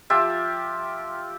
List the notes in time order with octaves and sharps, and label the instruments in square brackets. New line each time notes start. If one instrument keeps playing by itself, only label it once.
[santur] F3 F4 G4 E5